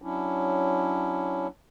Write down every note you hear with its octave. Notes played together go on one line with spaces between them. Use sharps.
F#3 C#4 D4 E4